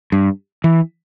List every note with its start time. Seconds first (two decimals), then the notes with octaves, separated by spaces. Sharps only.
0.12 G2
0.64 E3